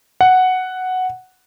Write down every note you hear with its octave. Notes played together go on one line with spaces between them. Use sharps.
F#5